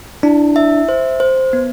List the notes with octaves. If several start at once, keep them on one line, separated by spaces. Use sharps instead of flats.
D4 E4
E5
C5
C5
B3